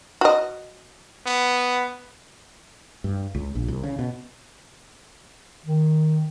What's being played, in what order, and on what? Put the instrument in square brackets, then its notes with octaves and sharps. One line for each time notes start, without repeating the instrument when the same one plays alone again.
[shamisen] F#4 D#5
[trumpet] B3
[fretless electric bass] G2
C#2
A#1
C2
C#3
B2
[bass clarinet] D#3